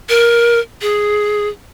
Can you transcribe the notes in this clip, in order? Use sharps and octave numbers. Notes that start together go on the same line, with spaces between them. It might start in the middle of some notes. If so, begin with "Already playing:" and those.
A#4
G#4